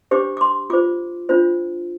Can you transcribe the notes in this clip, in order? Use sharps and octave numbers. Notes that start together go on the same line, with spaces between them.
D4 G4 C5 D6
D6
C6
F4 C5 D6
D4 F4 C5